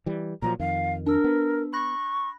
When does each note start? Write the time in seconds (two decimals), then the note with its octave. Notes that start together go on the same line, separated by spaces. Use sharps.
0.06 E3 G3
0.42 A#2 F3 F#3 A#5
0.60 F2 D#3 F5
1.06 D4 A#4 E6
1.24 B3
1.73 B5 C#6 F#6 A#6